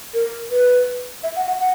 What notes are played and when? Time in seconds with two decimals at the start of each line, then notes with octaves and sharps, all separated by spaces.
0.14 A#4
0.51 B4
1.23 E5
1.36 F#5
1.47 F#5
1.59 F#5